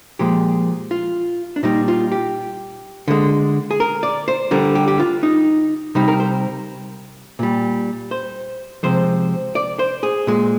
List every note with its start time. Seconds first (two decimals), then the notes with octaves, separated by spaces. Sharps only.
0.19 A#2 F3 G#3 G4
0.91 F4
1.56 D4
1.63 A#2 G3 D#4
1.88 F4
2.12 G4
3.08 D3 G#3
3.71 G#4
3.80 A#4
4.03 D5
4.28 C5
4.51 D3 G3 A#4
4.75 G4
4.88 G4
4.99 F4
5.23 D#4
5.95 C3 G3 D#4
6.08 A#4
6.20 C5
7.39 A#2 G3
8.11 C5
8.83 C3 F3 G#3 C5
9.55 D5
9.79 C5
10.03 G#4
10.27 A#2 G#3